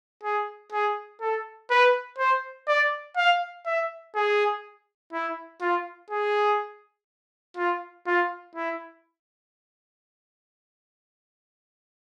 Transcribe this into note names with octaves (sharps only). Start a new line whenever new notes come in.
G#4
G#4
A4
B4
C5
D5
F5
E5
G#4
E4
F4
G#4
F4
F4
E4